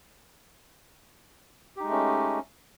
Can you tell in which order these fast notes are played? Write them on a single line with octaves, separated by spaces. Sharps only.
G4 D#4 G#3 A3 C#4